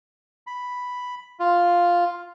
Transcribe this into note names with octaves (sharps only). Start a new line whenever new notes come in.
B5
F4